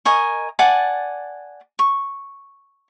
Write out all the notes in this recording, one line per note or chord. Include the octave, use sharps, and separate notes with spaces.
A#4 D#5 G#5 C#6
D5 F#5 G#5 A5
C#6